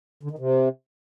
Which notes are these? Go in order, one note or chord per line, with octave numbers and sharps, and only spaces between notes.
D3
D#3
C3